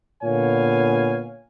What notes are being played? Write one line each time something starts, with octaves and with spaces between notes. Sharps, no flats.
A#2 D3 B3 C#5 F5 G#5